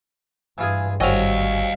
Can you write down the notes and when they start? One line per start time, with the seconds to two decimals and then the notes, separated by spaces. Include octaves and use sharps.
0.58 G2 E3 F4 G#4
1.01 G#1 G3 C4 C#4 F#4 D#5 F5